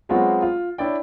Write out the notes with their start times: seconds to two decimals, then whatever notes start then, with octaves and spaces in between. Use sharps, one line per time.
0.09 F#3 G#3 B3 C4 F4 F#4
0.42 F4
0.78 D4 E4 C#5 D5 G5